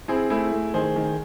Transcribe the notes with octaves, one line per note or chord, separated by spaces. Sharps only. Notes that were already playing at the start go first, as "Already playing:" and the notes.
C4 E4 G#4
A3 E4 G#4
A3
D#3 G#4 C5
D#3